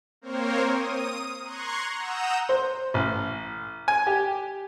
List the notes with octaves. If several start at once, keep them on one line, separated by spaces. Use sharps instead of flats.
A#3 C4 A#4 C5 C#5
D#6 D#7
A#5 C6 C#6 F#6 G#6
F#5 A#5 D#6 E6 G6 E7
C5
A1
G#5
G4